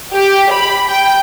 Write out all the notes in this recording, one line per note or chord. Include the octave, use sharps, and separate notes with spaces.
G4
B5
G5